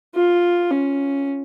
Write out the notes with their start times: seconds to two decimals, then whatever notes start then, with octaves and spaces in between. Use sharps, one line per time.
0.15 F4
0.71 C#4